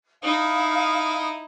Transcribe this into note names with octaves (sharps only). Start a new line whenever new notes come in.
D#4 E4 F5 D#6